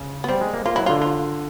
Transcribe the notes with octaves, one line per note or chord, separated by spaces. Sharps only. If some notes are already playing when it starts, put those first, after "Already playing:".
Already playing: C#3
B3
G3 C4
G#3
A#3
A#3 F4
F#3 E4
D3 F4
F4